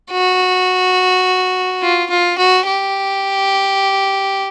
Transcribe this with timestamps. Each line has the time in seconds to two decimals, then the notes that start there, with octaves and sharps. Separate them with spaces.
0.12 F#4
1.82 F4
2.10 F4
2.38 F#4
2.67 G4